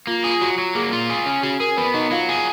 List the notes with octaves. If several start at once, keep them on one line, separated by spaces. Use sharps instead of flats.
A#3 F4
F4
G#4
F4
F#3 F#4
F#3
A#3 G#4
F4
G#4
C#4
F#4 G#4
G#4 A#4
B3 B4
F#3 D#4 D#5
F#3 F4 F5
G#4